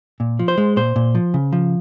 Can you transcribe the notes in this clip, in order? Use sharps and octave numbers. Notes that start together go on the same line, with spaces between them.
A#2
F3
C5
G#3
A#2 C5
A#2
F3
C#3
F3